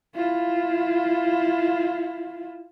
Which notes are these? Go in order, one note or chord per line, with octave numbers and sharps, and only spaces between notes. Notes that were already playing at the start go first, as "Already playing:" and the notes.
E4 F4